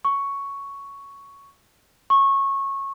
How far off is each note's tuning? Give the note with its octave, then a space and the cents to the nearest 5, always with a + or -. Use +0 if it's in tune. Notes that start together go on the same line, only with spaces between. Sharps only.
C#6 +5
C#6 -20